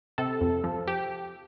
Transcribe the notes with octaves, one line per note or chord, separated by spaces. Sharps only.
C3 A4
F2
F3
G4